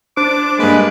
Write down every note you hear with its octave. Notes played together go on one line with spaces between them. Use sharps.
D4 C5 D6
G2 G#3 A#3 B4